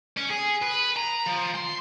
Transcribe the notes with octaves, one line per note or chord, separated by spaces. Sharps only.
C#4
G#4
B4
A#5
F3
C6